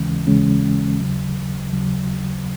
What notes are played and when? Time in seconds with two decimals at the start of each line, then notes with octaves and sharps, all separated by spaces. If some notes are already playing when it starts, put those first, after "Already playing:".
Already playing: D#2 C#3 E3 G#3 C#4
0.27 D#2 C#3 E3 G#3 C#4
0.99 D#2 C#3 F#3
1.73 D#2 C#3 F#3